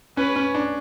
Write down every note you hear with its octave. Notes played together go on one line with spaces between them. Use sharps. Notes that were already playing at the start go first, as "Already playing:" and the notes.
C#4 B4
C#4
D4